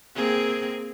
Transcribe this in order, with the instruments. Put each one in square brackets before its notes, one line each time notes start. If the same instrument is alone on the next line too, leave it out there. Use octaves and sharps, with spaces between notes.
[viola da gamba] A#3 C4 G#4